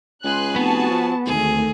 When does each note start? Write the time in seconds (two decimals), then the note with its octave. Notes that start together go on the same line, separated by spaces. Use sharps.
0.24 C#2 G#4 B4 C6 F#6
0.56 F1 B3 F#4 A5
0.91 F3
1.26 G#1 D2 D#3 A3 G#4